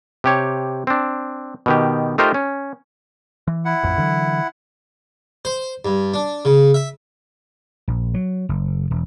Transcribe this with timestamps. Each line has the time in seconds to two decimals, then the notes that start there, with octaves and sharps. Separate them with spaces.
0.24 C3 G4 C#5
0.87 C4 D4
1.66 B2 D#3 G4
2.18 A3 D#4 F4 G4 A#4 C5
2.34 C#4
3.47 E3
3.65 E4 F#5
3.83 A1 F2
3.98 D3 E3 F#3
5.45 C5
5.85 G2
6.14 D4
6.45 C#3
6.74 E5
7.88 A#1
8.14 F#3
8.49 F#1
8.91 E1